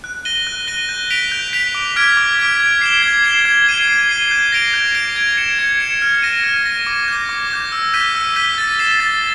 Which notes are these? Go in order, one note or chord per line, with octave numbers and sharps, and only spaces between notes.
F#6
A#6 D#7 G7
F#6
A#6 D#7 G7
G6
B6 D7 F7
G6
B6 D7 F7
D6
F6 G#6 B6 D7
D6
F6 G#6 B6 D7
G#6
C7 E7 G7
G#6
C7 E7 G7
G#6
C7 D#7 G7
G#6
C7 D#7 G7
G6
A#6 D7 F7
G6
A#6 D7 F7
G#6
C#7 E7
G#6
C#7 E7
F6
A#6 D#7
F6
A#6 D#7
D6
G6 A#6
D6
G6 A#6
E6
G6 B6 D#7 G7
E6
G6 B6 D#7 G7
A6
C7 E7 G7
A6